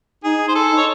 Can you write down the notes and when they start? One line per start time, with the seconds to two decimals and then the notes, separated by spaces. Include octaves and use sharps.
0.24 D#4 G#4
0.48 C5
0.55 A4
0.70 D#4
0.77 C#5